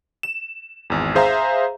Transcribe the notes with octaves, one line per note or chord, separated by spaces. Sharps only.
E7
G#1 E2
G#4 C5 E5 F5 A#5